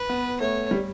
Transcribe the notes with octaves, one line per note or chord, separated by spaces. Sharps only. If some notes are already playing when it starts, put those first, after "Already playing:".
Already playing: B4
B3
A3 C#5
G3